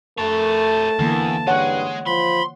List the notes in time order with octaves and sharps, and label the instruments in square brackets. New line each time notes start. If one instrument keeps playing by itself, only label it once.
[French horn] A3 [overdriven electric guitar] A#4 C#5 [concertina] A5
[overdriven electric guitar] E2 [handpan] D3 E3 A#3
[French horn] G2 [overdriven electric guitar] G#3 [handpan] C#5 F#5
[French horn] F3 [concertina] B5 [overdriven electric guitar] C6